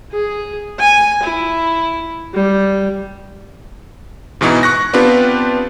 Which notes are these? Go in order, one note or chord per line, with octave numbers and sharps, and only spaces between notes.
G#4
G#5
E4
G3
G#2 B2 E3 B3 D#4
C#6 F#6 A#6
B3 C4 D4 F4 G4 B4